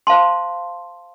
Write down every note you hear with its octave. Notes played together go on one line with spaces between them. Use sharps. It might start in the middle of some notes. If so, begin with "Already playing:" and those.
C5 F5 A5 C6